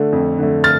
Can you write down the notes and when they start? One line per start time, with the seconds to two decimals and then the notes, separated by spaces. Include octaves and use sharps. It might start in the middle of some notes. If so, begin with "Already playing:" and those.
Already playing: D3 A3
0.13 F2
0.39 D3 A3
0.64 F6 A6